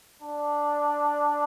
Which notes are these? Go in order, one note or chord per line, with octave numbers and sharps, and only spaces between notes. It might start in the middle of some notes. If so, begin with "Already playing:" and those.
D4